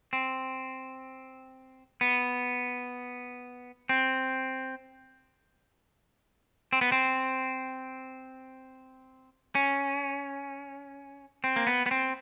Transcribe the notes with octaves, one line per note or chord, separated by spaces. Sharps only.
C4
B3
C4
C4
B3
C4
C#4
C4
A#3
B3
B3
C4